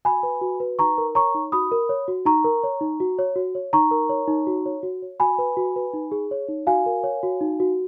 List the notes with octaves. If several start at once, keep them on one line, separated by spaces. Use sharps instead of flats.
F#4 G#5 B5
B4
F#4
B4
D#4 A#5 C#6
A#4
C#5 A#5 C#6
D#4
F#4 B5 D#6
A#4
C#5
F#4
D#4 A#5 C#6
A#4
C#5
D#4
F#4
C#5
F#4
C#5
D#4 A#5 C#6
A#4
C#5
D#4
F#4
C#5
F#4
C#5
F#4 G#5 B5
B4
F#4
B4
D#4
G#4
C#5
D#4
F#4 F5 G#5
A#4
C#5
F#4
D#4
F#4